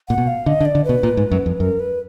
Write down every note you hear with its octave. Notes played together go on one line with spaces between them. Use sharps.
A#2 F#5
B2
F5
D3 D#5
D3
D5
D3
B2 B4
A#2
G#2
F#2
F2
F#2 A#4
B4